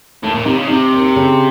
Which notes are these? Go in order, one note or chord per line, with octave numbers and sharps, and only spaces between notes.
D#2 A2
A#2
C3 D#4
C#3
C3 D#4
D#2
C#3